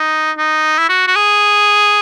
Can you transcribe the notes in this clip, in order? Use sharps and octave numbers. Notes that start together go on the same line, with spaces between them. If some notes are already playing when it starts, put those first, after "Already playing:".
Already playing: D#4
D#4
E4
F#4
F#4
G#4